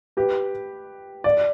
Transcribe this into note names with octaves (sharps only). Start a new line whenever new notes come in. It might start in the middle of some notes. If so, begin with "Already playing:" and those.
G4 B4
D5